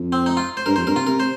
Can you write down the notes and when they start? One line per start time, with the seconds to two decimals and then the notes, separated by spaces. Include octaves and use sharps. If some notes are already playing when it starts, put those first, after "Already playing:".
Already playing: F2
0.12 C4
0.26 D#4
0.37 F4
0.57 C5
0.66 G2 A#4
0.76 F2 C5
0.86 G2 A#4
0.96 C3 F4
1.07 C3 A#4
1.20 C5